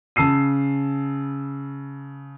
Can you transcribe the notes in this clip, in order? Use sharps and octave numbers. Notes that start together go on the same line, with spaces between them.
C#3 A5 E6 C7 D#7